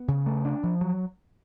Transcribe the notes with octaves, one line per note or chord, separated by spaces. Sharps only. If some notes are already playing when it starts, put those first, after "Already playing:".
Already playing: B3
C#3
A3
D4
F3
F#3